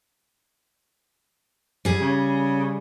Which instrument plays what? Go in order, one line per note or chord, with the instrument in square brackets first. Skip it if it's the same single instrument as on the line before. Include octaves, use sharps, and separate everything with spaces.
[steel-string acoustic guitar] G3 G#4
[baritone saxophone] C#3